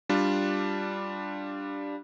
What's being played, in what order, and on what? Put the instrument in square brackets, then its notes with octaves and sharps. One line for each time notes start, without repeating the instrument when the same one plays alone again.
[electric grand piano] G3 D4 F4